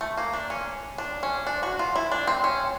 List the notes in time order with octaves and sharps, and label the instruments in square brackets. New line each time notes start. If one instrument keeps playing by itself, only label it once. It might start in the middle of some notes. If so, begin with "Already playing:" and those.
[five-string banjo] A3
A#3
D4
C#4
D4
C#4
D4
F#4
F4
E4
D4
C4
C#4